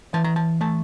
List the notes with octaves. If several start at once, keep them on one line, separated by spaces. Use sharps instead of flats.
E3 A5
A#5
A5
A3 A5